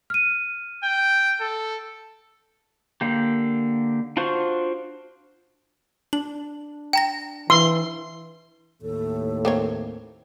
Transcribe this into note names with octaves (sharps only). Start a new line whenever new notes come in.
F6 D#7
G5
A4
D3 A#3 G4
D4 F4 F#4 C5 C#6
D4 F#7
G5 A#5 A#6
E3 C6 E6
D#2 A2 A4
A#3 C4 C#5